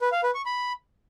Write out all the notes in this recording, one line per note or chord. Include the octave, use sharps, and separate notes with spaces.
B4
F5
B4
C#6
B5